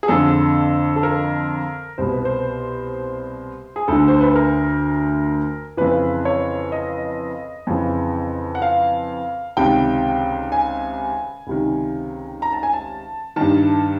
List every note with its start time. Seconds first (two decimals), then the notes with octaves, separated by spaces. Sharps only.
0.03 G#4
0.08 F2 D3 A4
0.96 A4
1.03 A#4
1.98 C2 B2 C5
2.12 B4
2.25 C5
3.76 G#4
3.88 D2 D3 A4
4.08 C5
4.21 B4
4.36 A#4
5.77 F2 C#3 E3 B4
6.25 C#5
6.72 D#5
7.67 F2 C#3 E3
8.55 F#5
8.62 F5
9.57 C#2 C3 D#3 G5
10.52 G#5
11.47 C#2 C3 D#3
12.42 A#5
12.53 A5
12.63 G#5
12.73 A5
13.36 G2 D#3 A5